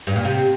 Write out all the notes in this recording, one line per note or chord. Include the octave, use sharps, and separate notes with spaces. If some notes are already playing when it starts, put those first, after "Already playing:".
G2
A#2
C3